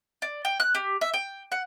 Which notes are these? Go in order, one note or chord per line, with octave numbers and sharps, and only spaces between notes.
D5
G5
F#6
G4
E5
G5
F#5